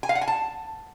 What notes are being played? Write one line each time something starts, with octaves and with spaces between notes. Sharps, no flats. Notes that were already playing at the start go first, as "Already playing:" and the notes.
G#5
F5
F#5
G#5
A5